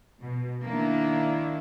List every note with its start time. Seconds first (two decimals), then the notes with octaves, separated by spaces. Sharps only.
0.22 B2
0.64 D#3 A#3 D4 E4